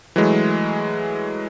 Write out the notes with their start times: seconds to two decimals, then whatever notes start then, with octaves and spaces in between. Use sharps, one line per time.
0.16 E3 F#3 G#3 A3